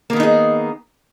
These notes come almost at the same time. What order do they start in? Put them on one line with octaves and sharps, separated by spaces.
A#3 D#3 B3 D#4 G#4